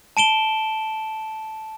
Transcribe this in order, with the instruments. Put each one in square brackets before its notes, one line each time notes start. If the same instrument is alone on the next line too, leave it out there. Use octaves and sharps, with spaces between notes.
[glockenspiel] A5 D7 E7 G7